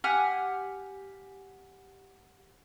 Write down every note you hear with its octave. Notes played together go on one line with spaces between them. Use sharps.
G4 F#5 G#5 F6